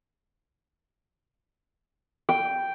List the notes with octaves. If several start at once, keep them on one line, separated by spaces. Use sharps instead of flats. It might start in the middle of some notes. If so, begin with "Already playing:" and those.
G5